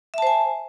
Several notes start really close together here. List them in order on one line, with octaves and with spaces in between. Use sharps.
E5 A5 C5 G#5